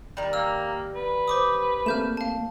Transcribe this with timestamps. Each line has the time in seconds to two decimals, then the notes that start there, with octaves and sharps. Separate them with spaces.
0.17 D#3 G3
0.33 A#3 E6 F6
0.96 B4
1.28 C5 D6 D#6
1.86 A3 A#3 C4 F6 G6 E7
2.17 F5 A5